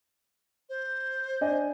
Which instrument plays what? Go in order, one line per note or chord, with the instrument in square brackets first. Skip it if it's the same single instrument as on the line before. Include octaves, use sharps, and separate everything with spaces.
[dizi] C5
[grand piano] D4 D#5 G#5